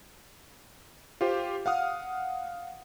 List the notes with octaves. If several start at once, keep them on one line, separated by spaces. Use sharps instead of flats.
F4 G4 C5
F5 F#5 D#6 F6